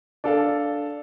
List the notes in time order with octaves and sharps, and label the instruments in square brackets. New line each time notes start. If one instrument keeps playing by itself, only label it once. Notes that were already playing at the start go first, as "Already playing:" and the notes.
[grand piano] D4 A4 F5 A5